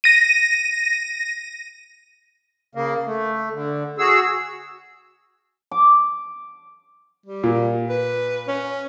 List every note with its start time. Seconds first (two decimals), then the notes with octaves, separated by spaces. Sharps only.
0.04 A#6 D#7
2.75 C#3 A#3
3.06 A3
3.53 D3
3.98 F#4 G#4 E6
5.71 D6
7.26 G3
7.44 A#2
7.89 B4
8.48 C#4